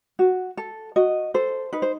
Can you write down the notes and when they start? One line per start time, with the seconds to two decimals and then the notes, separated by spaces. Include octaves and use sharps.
0.19 F#4
0.57 A4
0.96 F#4 D#5
1.34 A4 C5
1.73 D#4 B4
1.82 C5